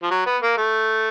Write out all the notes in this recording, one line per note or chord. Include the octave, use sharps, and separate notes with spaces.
F3
F#3
B3
A#3
A3